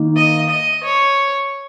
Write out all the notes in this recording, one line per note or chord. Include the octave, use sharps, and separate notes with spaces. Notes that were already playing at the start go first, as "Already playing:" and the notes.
Already playing: D#3 A#3 D#4
D#5
D#5
C#5